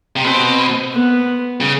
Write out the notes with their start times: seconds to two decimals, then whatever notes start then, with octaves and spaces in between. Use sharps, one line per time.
0.16 C3
0.24 B2 C4
0.93 B3
1.60 C#3